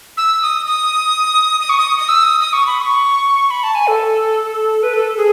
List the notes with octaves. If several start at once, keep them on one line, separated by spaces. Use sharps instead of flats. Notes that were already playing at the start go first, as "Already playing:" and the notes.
E6
D#6
D#6
D#6
C#6
D#6
D#6
E6
D#6
D#6
C#6
B5
C#6
B5
A5
G#5
A4
B4
A4
G#4